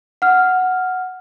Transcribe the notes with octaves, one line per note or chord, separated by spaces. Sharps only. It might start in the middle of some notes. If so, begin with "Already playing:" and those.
F#5 F6